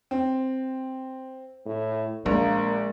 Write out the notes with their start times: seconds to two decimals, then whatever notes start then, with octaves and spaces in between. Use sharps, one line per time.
0.11 C4
1.66 A2
2.26 A#1 G#3 A#3